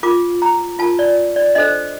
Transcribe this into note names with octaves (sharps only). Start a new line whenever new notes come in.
F4 A#4 D6
A#5
F4 A#4 A5
D5
D5
D4 A4 C5 D#5